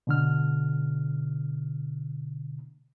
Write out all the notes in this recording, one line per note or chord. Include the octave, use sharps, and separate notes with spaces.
B2 D3 F6